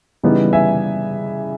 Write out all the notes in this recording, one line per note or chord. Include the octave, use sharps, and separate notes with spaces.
C#3 E3 G3 B3 D#4
E5 G#5